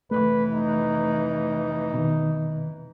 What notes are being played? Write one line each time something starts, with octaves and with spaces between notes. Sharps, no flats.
F1 E3 A3 B4
D#4
B2 D#3